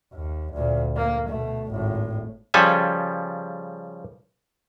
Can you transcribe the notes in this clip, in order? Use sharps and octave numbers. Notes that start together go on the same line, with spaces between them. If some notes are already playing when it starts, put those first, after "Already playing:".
D#2
D2 A#2
A#3
B2 A3
G#1 A2
C#3 F3 G3 A4 G#5